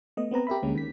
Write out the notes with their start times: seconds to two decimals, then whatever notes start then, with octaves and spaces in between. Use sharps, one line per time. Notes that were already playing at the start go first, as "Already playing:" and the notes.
0.17 A3 B3 D#5
0.31 B3 C4 B4 A#5
0.47 G4 A#4 E5 B5
0.63 D2 D3 G#3 A#3 C#4
0.75 D#3 B6